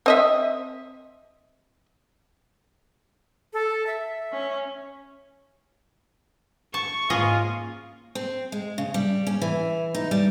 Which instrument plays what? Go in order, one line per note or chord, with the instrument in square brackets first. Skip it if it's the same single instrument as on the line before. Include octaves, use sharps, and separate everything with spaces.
[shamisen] C4 D#5 E5
[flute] A4
E5
[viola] C#4
[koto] A5 [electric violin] C#6
[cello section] G#2 A#3 [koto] C#4 G#4 D#5 [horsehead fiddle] F4
[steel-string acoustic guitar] C4
G#3
C#3
G3
C#4
E3
D#4
G3